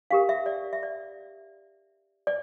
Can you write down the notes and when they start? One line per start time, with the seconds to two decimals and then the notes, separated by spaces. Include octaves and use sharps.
0.11 D4 G4 A#4 F5
0.29 E5
0.46 D5
0.73 E5
0.83 D5
2.27 D5